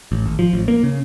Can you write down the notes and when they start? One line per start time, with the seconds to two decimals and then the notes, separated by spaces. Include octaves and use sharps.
0.12 A1
0.25 G#1
0.39 F3
0.54 A1
0.68 A#3
0.83 C#3